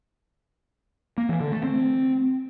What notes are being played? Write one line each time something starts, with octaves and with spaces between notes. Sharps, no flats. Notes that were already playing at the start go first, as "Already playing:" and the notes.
A#3
E3
D3
A3
C4